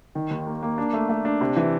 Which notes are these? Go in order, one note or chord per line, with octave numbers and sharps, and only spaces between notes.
D#3
D#2
A#3
A#3
D4
A3
A3
D4
C3
E3